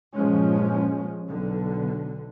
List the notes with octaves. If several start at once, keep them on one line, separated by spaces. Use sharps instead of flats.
G2 A#2 F3 G#3 C#4
B1 D3